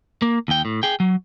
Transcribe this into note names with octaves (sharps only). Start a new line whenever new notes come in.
A#3
D#2 G5
A2
G#4 G5
F#3